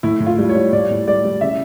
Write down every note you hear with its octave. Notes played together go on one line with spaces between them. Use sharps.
A2 E4
A2
F4
G3
C#5
G3
A2 D5
A2
G3 D5
G3
C#3 E5